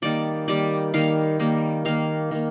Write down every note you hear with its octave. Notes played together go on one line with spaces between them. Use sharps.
D#3 G3 A#3 D5
D#3 G3 A#3 D5
D#3 G3 A#3 F5
D#3 G3 A#3
D#3 A#3 F5
D#3 A#3